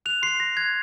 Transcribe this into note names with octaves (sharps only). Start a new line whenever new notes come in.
F#6 F7
C6 C7
C6 A#6
F#6 G#6